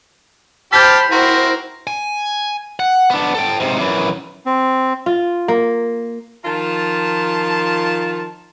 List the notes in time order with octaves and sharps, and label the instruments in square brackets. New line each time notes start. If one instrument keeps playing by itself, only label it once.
[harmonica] G4 A5 F6 [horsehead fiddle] C5 B5 [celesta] G6 B6
[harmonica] C4 F#4 A#4 [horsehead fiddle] E4 C5
[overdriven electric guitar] G#5
F#5
B3 D4
A4 G5
G#2 C3
F#2 E3
[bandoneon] C4
[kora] F4
A#3
[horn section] D#3 F3 F4 A5